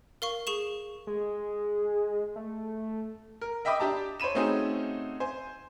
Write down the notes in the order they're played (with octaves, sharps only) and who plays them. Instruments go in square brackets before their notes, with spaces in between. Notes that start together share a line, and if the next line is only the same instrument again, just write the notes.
[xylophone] A#4 F5 C#6
G#4 C#6 E7
[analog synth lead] G#3
A3
[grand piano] A#4
D#5 E5 G5 B5 D6 D#6
D4 G4 A5 A#5
C5 C#5 B5 D#7 E7
A3 C4 C#4 D#4 F#4 G#4
C5 G#5